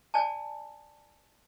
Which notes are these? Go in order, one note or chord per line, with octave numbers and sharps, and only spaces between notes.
D5 G#5 A5